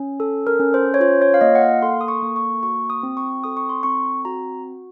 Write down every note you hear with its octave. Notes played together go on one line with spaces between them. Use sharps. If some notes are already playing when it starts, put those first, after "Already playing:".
Already playing: C#4
A4
A#4
C#4
C5
C#5
F4 C5
C#5
F5
A#3 D#5
F#5
F5
A4 C6
D#6
C#6
A#3
C#6
F#4 C#6
D#6
C4
C#6
A4 D#6
C#6
C6
C4 C#6
F#4 A#5